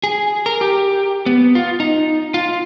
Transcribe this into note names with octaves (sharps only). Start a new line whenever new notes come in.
G#4
A#4
G4
B3
F4
D#4
F4